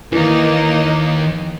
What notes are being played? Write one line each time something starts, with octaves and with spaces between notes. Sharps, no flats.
D#2 E3 A#3 D#4